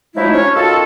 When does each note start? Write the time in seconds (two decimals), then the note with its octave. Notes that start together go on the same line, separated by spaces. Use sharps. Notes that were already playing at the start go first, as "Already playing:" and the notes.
0.16 F3 F#3 G#3 A3 D#4 E4
0.33 C#4 D4 C#5
0.55 D#3 F4 F#4 A4